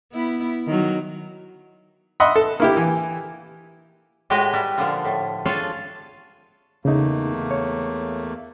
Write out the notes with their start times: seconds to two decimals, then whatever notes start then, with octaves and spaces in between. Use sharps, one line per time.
0.13 B3 E4
0.67 D#3 F#3
2.20 D#5 E5 F#5 B5 C6
2.36 A4
2.60 A#3 E4 G4
2.77 E3
4.30 A2 G#3 F#4 G4 B4 D#5
4.53 G3 E4
4.78 A#2 D3 F3
5.05 A2
5.45 D4 F4 G#4 A4 C#5 F5
6.85 E2 C#3 A3 A#3 D#4
7.51 C#5